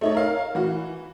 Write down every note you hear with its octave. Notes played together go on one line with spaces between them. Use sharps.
A3 D#4 C#5
A#4 F5
E3 F#4